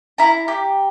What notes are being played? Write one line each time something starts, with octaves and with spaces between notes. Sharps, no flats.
E4 A#5
G4